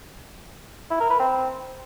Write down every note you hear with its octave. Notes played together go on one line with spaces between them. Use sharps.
E4
A#4
B4
C4